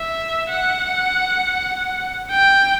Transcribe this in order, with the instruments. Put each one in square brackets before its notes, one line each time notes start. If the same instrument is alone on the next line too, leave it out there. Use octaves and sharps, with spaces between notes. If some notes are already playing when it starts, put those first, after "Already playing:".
Already playing: [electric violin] E5
F#5
G5